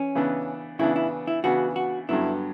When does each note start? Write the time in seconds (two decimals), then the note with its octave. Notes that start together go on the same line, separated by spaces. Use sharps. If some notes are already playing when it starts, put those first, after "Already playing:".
Already playing: E3 C#4
0.15 C#3 E3 B3 D4
0.79 C#3 E3 B3 D4 E4
0.96 E4
1.27 E4
1.44 C#3 E3 B3 D4 F#4
1.76 F#4
2.09 G2 D3 F#3 B3 E4